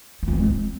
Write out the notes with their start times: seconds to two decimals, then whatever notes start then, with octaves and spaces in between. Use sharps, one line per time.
0.23 E4
0.28 F4
0.33 C4
0.38 G#3
0.43 C4